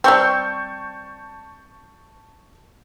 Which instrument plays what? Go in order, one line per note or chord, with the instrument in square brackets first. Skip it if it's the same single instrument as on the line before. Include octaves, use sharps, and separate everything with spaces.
[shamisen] G3 C4 [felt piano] A5 C#6 G6